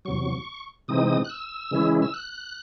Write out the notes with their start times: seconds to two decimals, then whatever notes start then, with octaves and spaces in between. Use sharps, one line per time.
0.05 E2 C3 F#3 C#6
0.88 C3 E3 G#3 C4 D#4 D#6
1.25 F#6
1.30 E6
1.71 C#3 E3 G#3 C#4 E4
2.02 E6
2.14 F#6